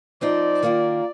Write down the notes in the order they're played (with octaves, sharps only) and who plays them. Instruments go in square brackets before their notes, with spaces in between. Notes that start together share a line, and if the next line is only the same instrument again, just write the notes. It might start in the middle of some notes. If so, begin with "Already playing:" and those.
[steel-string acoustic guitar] F3 C4 D#4 [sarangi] D5
[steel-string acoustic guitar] D#3 A#3 F4 A#4